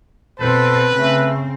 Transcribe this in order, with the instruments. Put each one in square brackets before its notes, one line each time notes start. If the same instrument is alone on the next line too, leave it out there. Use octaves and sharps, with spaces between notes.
[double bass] B2 [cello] C4 A4 [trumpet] B4 [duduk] C5
[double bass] C#3 [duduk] A3 [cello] C4